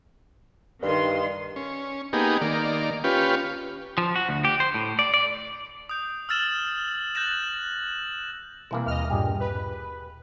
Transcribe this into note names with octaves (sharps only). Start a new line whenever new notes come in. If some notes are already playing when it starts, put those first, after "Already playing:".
G2 D#3 C6
C#4
A#3 B3 D#4 G4 G#4
D#3 A#3 D5
C#4 F4 G4 B4
F3
F#4
D2
G4
C5
A2
D5
D5
D#6 G6
E6 F6 A6 E7 F#7
F#6 G6 A6 A#6 E7 F#7
C2 B2 E3 A#3
D#2 D#5 F6
G2 A#2 G4 G#4
B4